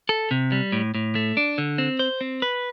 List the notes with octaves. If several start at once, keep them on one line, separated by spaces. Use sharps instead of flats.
A4
C3
G3
A2
A2
A3
D4
D3
C4
C5
C4
B4